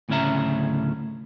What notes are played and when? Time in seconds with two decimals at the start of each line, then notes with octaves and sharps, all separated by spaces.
0.09 D2 A2 C#3 C#4 E5 A#5